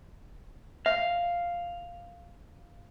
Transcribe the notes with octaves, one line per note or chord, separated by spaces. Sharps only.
E5 F5